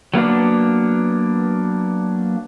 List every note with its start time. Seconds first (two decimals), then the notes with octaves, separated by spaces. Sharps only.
0.14 F#3 A#3 B3 D4